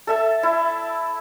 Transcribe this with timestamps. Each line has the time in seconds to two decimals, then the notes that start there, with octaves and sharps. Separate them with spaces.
0.07 A4 E5 A5
0.43 E4